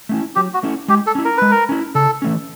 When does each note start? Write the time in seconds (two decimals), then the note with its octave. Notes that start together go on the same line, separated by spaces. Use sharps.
0.09 A3 C#4 E4
0.36 F#3 G4
0.54 F#4
0.63 A3 C#4 E4
0.88 G#3 G4
1.07 A4
1.15 C#4 E4
1.25 A#4
1.38 G#3 B4
1.51 A#4
1.69 C#4 E4
1.95 C#3 A4
2.22 E3 A3 C#4